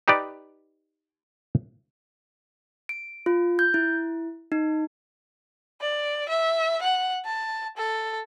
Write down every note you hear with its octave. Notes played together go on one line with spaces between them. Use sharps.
D#4 G4 B4 D5
D7
F4
G6
E4
D#4
D5
E5
F#5
A5
A4